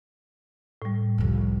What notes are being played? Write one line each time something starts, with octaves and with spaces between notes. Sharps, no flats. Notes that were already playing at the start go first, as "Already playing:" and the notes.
A2 G3
C2 F2